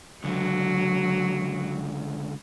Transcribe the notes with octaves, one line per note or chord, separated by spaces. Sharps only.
C#2 D3 F#3